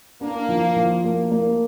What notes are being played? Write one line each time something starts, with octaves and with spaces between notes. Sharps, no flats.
A#3 D4
F3
F3
A#3
A#3